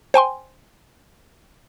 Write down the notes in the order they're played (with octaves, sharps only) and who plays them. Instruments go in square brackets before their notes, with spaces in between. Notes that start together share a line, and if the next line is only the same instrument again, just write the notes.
[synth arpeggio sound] C5 G5 G#5 C6